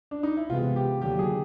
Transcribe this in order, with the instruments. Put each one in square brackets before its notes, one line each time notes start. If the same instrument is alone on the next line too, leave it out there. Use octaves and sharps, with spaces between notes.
[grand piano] D4
D#4
E4
[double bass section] C3 E3 G#3 B3 [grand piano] F4
[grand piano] G4
[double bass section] D#2 D3 F#3 [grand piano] G4
[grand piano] G#4